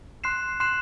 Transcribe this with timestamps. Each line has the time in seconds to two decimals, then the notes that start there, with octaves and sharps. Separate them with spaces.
0.24 C6 F#6 C7 E7
0.60 C6 F#6 C7 E7